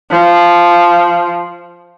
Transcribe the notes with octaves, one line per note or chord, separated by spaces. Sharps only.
F3